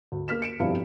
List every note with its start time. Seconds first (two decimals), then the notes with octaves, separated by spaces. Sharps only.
0.12 D2
0.28 A#3 F6 B6 E7
0.42 C#7 D7 E7
0.60 F1 G2 B2 F3 E4 F5